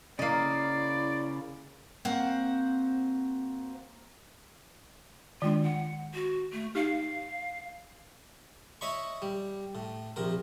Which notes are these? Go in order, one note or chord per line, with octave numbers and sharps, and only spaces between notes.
C#3 A#3 E4 D5 D#5 F5
A#3 C4 F#4 C5 F#5
D#3 G#3 D4 F4
F#5
F#4
A3
D#4 G4 F5
E4 C#5 D#5 B5 C#6
G3
A2
A#1 C3 A#4